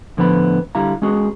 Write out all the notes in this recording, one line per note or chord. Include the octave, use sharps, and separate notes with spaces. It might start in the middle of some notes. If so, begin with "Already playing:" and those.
A2 D3 F3 B3 A#5 B5
D3 G3 E4 F5 A#5
G#3 C#4 F#4 G#4